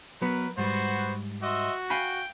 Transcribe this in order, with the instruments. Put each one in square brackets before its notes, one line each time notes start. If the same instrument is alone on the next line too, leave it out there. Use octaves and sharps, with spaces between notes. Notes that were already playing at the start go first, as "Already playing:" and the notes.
[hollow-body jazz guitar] F#3 B3 [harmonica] A#4 [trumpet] B4
[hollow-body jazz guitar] G#2 G3 [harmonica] B3 F#4 B4 [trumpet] C5
[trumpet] F#4 [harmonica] C5 D#5 E5
[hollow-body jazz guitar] F5 G#5 B5 [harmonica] G5